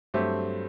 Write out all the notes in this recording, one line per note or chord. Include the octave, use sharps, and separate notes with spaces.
G2 F#3 A3 C4 G4